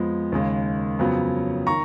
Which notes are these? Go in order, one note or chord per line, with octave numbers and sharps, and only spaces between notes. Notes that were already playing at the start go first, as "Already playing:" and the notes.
Already playing: F2 F3 G#3 B3
D#2 C#3 G#3
F2 C#3 F#3 B3
D#3 A#5 C#6